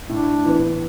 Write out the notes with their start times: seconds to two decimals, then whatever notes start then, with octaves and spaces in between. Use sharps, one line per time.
0.09 A2 D4
0.46 E3 B3